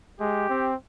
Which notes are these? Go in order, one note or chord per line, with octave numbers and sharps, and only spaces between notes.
G#3 G4
C4